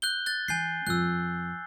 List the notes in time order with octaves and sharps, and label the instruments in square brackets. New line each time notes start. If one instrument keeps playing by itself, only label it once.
[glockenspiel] F#6 G6 G7
F#6 A6
[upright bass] E3 [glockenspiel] G#5 G6 C7
[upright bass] F2 [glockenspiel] E6 F#6